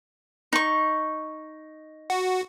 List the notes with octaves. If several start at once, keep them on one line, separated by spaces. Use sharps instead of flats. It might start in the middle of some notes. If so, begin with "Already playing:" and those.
D#4 C#6
F#4